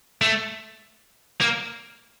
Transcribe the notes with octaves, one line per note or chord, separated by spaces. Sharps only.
A3
A#3